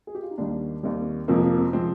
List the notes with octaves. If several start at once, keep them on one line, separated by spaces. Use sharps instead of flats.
G#4
G4
F4
D#4
D#2 D#3 G3 D4
D#2 D#3 G3 C4
F2 C3 F3 G#3 A#3
A#3
C4
C3 F3 G#3 C4